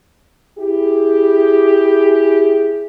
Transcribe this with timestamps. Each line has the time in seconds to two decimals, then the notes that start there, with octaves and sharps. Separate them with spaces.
0.59 E4 G4 G#4